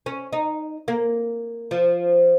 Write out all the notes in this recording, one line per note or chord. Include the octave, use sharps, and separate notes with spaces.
C#4
D#4
A#3
F3